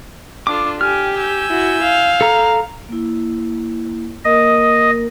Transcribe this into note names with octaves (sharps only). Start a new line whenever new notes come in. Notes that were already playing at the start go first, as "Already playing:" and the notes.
D4 F4 A4 D6
G4 G5 G#5 F6
G#5 E6 G6
E4 F#4
F5
A4 A#5
A#3 E4
A#3 A#4 D#5